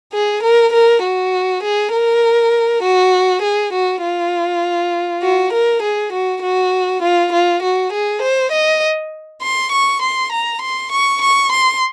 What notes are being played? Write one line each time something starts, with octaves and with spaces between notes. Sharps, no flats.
G#4
A#4
A#4
F#4
G#4
A#4
F#4
G#4
F#4
F4
F#4
A#4
G#4
F#4
F#4
F4
F4
F#4
G#4
C5
D#5
C6
C#6
C6
A#5
C6
C#6
C#6
C6